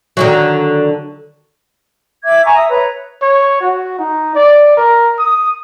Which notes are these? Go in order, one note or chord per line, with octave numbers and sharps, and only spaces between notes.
D3 D#3 F#3
E5 D6 G#6
G#5 A#5 C#6
E5 D#6
B4 C#5 A#5
C#5
F#4
D#4
D5
A#4
D#6